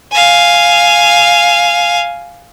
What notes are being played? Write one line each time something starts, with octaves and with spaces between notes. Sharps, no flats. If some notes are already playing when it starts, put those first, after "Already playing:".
F5 G#5